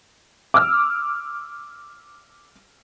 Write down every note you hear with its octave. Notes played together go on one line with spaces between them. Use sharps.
D6 E6 F6